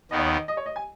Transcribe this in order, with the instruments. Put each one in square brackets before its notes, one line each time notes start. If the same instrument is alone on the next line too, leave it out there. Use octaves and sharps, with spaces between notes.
[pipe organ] D#2 D#3 B3 [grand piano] D#5
[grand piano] C#5
D#5
D#5
C#5
D#5
G#5